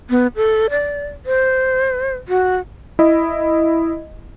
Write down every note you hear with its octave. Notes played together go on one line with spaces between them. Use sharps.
B3
A4
D5
C5
F#4
E4 D#5